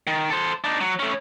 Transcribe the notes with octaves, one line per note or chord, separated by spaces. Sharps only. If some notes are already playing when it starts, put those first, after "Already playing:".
D#3
A4 C5
D4 D#4
F#3
A3 C#4